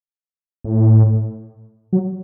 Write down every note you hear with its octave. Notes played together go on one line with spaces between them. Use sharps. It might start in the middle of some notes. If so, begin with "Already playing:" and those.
A2
F#3